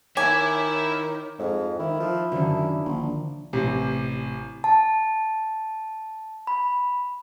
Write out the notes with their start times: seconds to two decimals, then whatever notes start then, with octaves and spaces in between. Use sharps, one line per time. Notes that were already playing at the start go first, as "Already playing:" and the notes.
0.17 D#3 E4 C#5 E5 G#5 D6
1.39 F2 G#2
1.79 D#3 E4
2.00 F3
2.32 F#2 D3 D#3
2.85 A#1
3.53 A1 C3
4.64 A5
6.47 B5